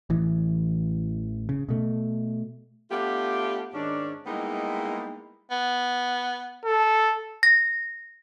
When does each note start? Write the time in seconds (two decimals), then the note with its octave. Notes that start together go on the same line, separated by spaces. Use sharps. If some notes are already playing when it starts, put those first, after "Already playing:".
0.10 A1 E3
1.49 C#3
1.69 B2 A3
2.90 A3 B3 D4 F4 G4
3.74 G#2 D#3 C#4 D4
4.26 G3 G#3 A#3 B3 D#4 E4
5.51 B3
6.65 A4
7.43 A#6